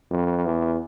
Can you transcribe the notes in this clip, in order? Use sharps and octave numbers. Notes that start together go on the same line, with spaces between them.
F2
E2